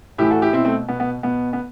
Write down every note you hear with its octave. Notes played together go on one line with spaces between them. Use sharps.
A2 E3 E4 G4
F#4 A4
E4 G4
B2 C4 E4
A3 C4
B2 B3
B3
B2 B3
B3